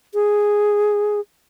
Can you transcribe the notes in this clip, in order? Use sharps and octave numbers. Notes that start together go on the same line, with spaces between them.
G#4